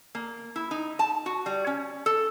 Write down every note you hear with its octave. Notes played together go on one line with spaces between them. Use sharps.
A#3
E4
D#4
A5
F#4
G3
C#4
A4